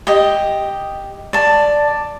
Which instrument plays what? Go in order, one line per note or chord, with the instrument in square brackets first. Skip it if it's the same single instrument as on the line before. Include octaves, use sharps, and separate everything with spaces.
[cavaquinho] G4 D#5
D5 A5